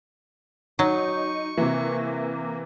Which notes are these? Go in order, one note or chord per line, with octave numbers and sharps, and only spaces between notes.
F#3 D#4 C#6
C3 E3 A#3